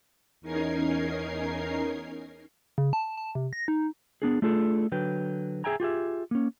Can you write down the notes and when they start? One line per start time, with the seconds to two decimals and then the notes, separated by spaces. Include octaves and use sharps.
0.41 E2 C#4 D#4 A#4 G#6 C7
2.78 C#3
2.93 A5
3.17 A5
3.35 C3
3.53 A#6
3.68 D#4
4.22 B3 D4 G#4
4.42 A3 D4 F4 G#4 A4
4.92 D3 F#3 B4 G5
5.64 G#4 E5 G5 G#5 A#5
5.80 F4 G4 G#4 E5
6.31 A#3 C#4